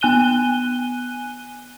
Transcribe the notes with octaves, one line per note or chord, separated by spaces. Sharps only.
B3 G#5 F#6 D#7 G7